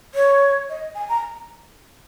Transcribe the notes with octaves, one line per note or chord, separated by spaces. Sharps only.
C#5
D#5
G#5
A#5